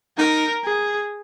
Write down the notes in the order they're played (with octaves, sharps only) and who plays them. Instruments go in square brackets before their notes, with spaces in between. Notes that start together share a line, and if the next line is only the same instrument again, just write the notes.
[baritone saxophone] D#4 [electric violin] A#4
[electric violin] G#4